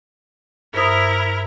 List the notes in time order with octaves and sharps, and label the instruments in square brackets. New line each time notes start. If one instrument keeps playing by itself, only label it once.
[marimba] G2 C5 D#6 [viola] E4 A#4